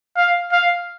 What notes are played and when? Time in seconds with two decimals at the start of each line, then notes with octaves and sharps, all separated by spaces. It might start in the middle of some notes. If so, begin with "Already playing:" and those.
0.17 F5
0.53 F5